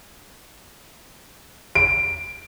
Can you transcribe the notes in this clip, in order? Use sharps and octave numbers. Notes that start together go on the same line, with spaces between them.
D7